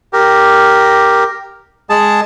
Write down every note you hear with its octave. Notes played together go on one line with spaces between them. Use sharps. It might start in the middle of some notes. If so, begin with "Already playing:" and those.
G4 A#4
G#3 G#4 A5